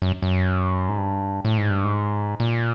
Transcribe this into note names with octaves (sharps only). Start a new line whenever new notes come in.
F#2
F#2
G#2
G2
A2
G#2
G2
G#2
A#2